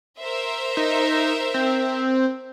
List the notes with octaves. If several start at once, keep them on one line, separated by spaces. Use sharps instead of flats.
A#4 C5 E5
D#4
C4